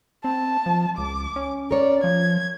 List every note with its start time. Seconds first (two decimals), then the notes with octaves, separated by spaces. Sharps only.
0.24 C4 A5
0.66 F3
0.98 C#2 D6
1.36 C#4
1.71 A#4 C#5 D5
2.04 F3 G#6